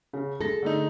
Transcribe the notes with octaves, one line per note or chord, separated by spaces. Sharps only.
C#3
G#3 A4 A#6
D3 A3 D#4